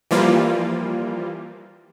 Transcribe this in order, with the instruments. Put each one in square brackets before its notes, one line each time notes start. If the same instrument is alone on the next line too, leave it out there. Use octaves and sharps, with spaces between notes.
[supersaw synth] E3 F3 G3 A#3 F4